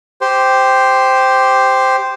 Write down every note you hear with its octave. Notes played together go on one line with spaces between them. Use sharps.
G4 C5